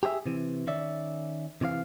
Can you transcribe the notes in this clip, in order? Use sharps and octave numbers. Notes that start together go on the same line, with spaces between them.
G4 G#4 C5 E5
C3 E3
D#3 C#4 D5 E5
C3 E3 C#5 F5